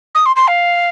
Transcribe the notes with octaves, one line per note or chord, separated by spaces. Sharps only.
D#6
C6
C6
F5